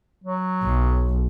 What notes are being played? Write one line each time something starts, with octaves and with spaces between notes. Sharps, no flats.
F#3
B1